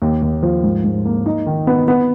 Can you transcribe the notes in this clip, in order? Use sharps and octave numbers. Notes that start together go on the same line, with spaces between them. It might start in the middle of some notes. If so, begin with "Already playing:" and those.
D#2
D#2
F3
G#2
G#2
A#3
D#4
D#3
B3
B3